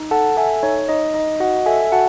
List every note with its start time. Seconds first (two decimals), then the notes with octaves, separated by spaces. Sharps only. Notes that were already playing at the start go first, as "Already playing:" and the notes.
Already playing: D#4
0.11 A4 F#5 A5
0.37 A4 E5 G#5
0.63 D#4 C#5
0.89 D#4 D#5
1.14 D#4 D#5
1.40 F#4 D#5 F#5
1.66 A4 E5 G#5
1.92 F#4 F#5 A5